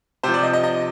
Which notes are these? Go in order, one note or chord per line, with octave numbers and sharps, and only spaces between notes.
C3 F3 C5
D5
D#5
D#5
D#5